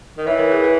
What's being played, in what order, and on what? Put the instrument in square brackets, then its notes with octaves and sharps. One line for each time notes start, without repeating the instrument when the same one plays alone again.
[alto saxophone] D#3
[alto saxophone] E3 [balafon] C#5 E5
[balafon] A#4 C#5
G#4 B4
G#4 B4